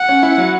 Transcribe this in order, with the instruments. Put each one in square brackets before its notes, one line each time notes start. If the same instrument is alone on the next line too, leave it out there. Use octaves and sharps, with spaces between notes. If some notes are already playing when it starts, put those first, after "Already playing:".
Already playing: [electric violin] F#5
[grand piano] C#4
E4
F#3